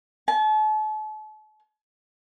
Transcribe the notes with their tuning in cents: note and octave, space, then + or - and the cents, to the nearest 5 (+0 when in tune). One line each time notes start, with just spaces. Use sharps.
A5 -40